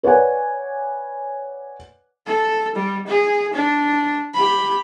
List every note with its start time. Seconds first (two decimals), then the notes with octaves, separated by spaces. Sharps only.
0.03 B4 C#5 D5 F#5 G#5
2.26 A4
2.75 G3
3.07 G#4
3.53 D4
4.34 G4 B5